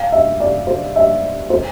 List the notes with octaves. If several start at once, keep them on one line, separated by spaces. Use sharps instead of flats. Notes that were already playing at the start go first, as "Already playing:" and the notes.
Already playing: F5
E5
D5
C5
E5
C5